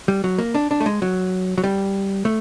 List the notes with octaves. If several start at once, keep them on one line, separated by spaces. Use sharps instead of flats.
G3
F#3
A#3
D4
D4
A3
G#3
F#3
F#3
G3
A3